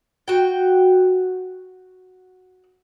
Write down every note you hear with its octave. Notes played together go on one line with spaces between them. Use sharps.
F#4 G5